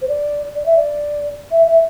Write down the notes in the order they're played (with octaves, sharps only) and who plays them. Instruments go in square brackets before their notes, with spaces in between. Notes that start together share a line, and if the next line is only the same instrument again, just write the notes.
[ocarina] C5
D5
D5
E5
D5
E5
E5